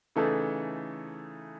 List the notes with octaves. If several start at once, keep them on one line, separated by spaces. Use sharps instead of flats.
C#3 E3 A3 D#4 A4